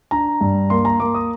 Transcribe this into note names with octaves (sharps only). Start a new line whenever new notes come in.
D4 A#5
G2
A#3 C6
A#5
A#3 D6
D#6